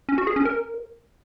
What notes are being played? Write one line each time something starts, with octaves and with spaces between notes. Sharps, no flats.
C#4
F#4
G#4
C#4
A#4